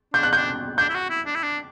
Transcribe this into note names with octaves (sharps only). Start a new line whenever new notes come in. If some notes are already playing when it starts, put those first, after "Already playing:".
D4 G6
F#6
D4 G6
D4 G6
E4
F#4
E4
D4
E4
D4